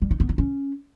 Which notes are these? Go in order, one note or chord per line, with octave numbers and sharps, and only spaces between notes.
G3
D#4
B3
D#4
C#4